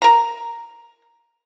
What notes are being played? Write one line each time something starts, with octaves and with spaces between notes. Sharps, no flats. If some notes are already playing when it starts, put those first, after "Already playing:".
A#4 A#5